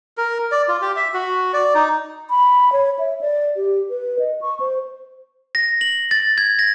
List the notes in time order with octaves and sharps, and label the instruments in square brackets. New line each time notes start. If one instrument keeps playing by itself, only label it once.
[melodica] A#4
D5
F4
G4
E5
F#4
D5
D#4
[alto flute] B5
C#5
E5
D5
G4
B4
D#5
C#6
C5
[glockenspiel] A#6
F#7
A6
G#6
A#6